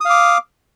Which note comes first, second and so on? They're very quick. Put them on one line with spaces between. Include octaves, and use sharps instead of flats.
D#6 F5 D6